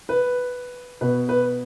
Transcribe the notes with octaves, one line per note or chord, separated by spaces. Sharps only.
B4
B2 B4
B4